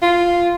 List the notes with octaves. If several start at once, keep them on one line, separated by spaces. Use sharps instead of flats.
F4